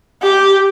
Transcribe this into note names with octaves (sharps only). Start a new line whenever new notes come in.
G4